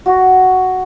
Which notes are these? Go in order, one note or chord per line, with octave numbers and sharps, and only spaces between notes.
F#4